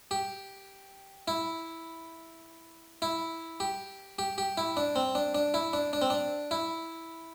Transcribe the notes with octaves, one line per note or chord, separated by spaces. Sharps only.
G4
E4
E4
G4
G4
G4
E4
D4
C4
D4
D4
E4
D4
D4
C4
D4
E4